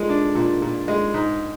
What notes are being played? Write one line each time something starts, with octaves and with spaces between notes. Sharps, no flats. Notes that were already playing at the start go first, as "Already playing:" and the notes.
Already playing: A#2 G#3
D4
A#2
A#2
G#3
G#2